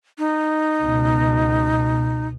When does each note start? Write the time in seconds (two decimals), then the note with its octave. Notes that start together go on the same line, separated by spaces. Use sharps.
0.18 D#4
0.81 C#2 B2